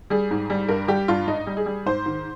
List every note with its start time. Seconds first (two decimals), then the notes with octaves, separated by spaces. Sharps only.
0.10 G3 G#4
0.31 G#2
0.50 G3
0.68 G2 A#4
0.88 G3 G4
1.08 G2 F4
1.27 G#2 D#4
1.47 G3
1.57 G#4
1.66 G3
1.86 G#2 C5
2.06 D#3